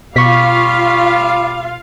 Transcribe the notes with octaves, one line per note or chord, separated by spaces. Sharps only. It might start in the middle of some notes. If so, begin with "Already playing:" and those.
B2 G3 F4 F5 C#6 B6